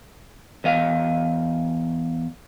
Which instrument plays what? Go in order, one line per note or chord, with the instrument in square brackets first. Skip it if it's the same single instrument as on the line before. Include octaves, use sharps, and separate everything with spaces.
[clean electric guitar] E2 D#5 F5